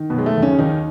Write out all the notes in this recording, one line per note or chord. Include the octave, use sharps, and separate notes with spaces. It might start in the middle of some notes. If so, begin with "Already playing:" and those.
Already playing: D#3
B2 B3
F#3 G#3
A3
D#2
C#3 C#4
D#2 D#3 D#4